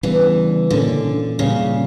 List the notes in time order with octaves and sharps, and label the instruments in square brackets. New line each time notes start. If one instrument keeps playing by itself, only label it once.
[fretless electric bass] C#3 G3 B3 D4 [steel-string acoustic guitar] E3
[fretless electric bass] A#2 A#3 C#4 [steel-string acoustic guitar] D3
[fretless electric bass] A#2 G3 C#4 [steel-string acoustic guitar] C#3